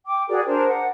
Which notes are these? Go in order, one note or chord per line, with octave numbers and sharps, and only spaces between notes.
G5 D6
F#4 G#4 A#4 D5
D4 A#4 C5
F#5